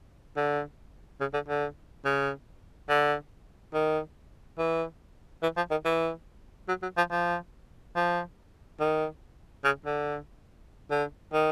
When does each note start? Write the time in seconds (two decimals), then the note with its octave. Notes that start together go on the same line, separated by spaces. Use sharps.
0.36 D3
1.21 C#3
1.34 D3
1.48 D3
2.05 C#3
2.89 D3
3.74 D#3
4.58 E3
5.43 E3
5.57 F3
5.71 D#3
5.85 E3
6.68 F#3
6.82 F#3
6.97 F3
7.11 F3
7.96 F3
8.80 D#3
9.64 C#3
9.86 D3
10.91 D3
11.33 D#3